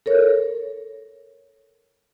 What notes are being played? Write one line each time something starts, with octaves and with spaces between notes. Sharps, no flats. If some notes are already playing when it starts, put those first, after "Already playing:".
A4 A#4 C#5